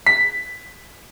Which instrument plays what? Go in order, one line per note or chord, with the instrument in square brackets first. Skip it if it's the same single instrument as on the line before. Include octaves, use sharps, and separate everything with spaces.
[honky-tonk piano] B6